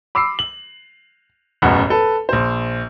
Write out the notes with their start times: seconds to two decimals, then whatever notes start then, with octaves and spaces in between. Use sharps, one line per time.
0.15 B5 D6 E6 C7
0.39 F#7
1.62 E1 A1 F#2 F#5
1.90 A4 B4
2.29 A#1 C5